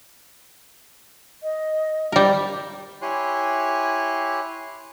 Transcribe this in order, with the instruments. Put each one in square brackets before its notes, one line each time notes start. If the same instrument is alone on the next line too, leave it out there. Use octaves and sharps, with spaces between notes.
[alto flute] D#5
[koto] G3 A#4
[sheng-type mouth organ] E4 G4 C#5 G#5 C6 F#6